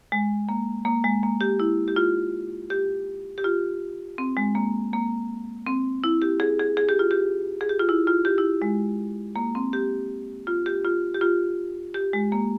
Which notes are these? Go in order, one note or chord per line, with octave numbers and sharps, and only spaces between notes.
G#3
A#3
A#3
G#3
A#3
G4
E4
G4
F4
G4
G4
F4
C4
G#3
A#3
A#3
C4
E4
G4
G#4
G#4
G#4
G4
F4
G4
G#4
G4
F4
E4
F4
G4
E4
G#3
A#3
C4
G4
F4
G4
F4
G4
F4
G4
G#3
A#3